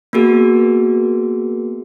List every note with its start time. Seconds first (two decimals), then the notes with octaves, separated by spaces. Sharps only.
0.13 A#3 B3 F#4 G#4 A#4